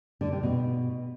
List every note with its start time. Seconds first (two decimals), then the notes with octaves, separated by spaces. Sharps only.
0.21 D3
0.32 C3
0.43 B2